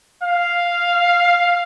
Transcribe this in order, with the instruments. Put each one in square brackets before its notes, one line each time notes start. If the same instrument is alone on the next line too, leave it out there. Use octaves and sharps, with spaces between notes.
[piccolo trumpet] F5